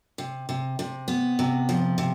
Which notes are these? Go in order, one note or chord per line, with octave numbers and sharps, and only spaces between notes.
C3
C3
C3
B3
C3
F3
C3